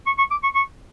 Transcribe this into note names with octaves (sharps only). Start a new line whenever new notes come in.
C#6
C#6
D6
C#6
C#6